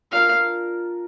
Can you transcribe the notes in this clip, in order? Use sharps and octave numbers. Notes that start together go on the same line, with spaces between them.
D4 F4 A#4 F5